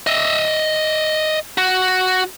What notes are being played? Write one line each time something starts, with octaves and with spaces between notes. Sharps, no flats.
D#5 E5
F#4